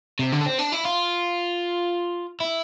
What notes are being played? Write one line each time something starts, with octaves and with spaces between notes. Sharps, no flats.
C3
D3
D4
C4
D4
E4
F4
E4